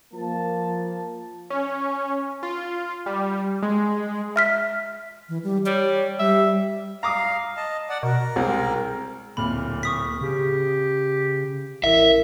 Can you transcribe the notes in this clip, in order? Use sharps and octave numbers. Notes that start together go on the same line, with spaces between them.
F3 A#3 A5
C#4
F4
G3
G#3
E5 F6 B6
E3
G3
G3 C#5
G3 E5
F5 A#5 D6 D#6
D#5 A5
D5 F#5
B2 A#4
C2 G#3 C4
D1 A#2 B5 F6
C#6 D#6 B6
C#3 G4
A1 E4 A#4 E5